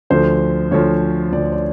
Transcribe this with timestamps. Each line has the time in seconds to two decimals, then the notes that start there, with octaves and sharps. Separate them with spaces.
0.10 D2 D3 F3 C5
0.71 D2 D3 F3 C#5
1.32 D2 D3 F3 D5
1.52 D5